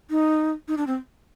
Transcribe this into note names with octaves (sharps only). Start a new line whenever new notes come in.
D#4
D#4
D4
C4